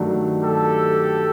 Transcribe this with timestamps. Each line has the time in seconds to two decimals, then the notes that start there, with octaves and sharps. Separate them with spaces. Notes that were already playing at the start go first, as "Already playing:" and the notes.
Already playing: G2 D#3 F#3 A3 D4
0.43 G4 A4